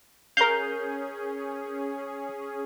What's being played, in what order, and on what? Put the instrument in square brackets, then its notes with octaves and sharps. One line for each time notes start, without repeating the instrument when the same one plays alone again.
[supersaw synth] C#4 G#4 [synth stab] A#4 G6 [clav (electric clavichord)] F5